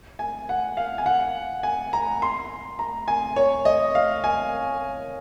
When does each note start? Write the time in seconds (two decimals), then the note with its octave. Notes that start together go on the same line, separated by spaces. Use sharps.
0.19 G#5
0.49 F#5
0.77 F5
0.98 G#5
1.06 F#5
1.63 G#5
1.93 A#5
2.22 C6
2.79 A#5
3.08 G#5
3.36 C#5
3.65 D#5
3.95 F5
4.24 G#5